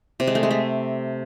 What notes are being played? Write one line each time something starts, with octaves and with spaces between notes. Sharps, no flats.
C3
G#3
A3
G#3
A3